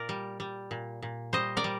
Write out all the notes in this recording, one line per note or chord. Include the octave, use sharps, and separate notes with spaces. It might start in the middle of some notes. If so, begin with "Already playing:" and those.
Already playing: A#2 A#4 D5
G3
G3
A#2
A#2
G3 C5 D#5
A#4 D5
G3